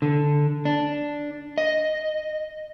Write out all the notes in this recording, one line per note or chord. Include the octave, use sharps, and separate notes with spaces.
D3
D4
D#5